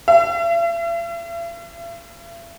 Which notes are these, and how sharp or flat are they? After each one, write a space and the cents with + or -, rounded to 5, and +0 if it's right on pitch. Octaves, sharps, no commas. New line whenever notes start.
E5 +45